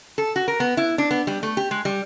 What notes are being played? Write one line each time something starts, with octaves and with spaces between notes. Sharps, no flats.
A4
F#4
A#4
B3
E4
D4
B3
G3
A3
G4
G#3
G3